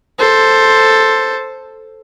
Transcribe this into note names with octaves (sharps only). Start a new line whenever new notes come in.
A4 C5